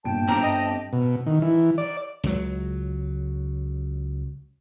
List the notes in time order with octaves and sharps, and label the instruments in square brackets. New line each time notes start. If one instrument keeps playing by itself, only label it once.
[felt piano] G1 A#2 D7 [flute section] G5 A5
[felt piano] G1 D4 [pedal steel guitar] C4 G4 [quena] A#5
[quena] D#5
[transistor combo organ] B2
D#3
E3
D5
[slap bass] C#2 F#3